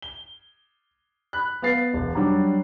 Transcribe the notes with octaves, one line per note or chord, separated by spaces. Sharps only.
G7
B5 F#6
B3 B4 F5 A6 C7
E1
F#3 G3 D4